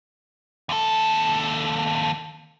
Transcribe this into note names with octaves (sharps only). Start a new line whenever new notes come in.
D#2 A4